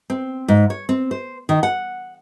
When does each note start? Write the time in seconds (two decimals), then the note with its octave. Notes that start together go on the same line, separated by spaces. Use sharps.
0.10 C4
0.48 G#2
0.70 C#5
0.89 C4
1.11 C5
1.49 D#3
1.63 F#5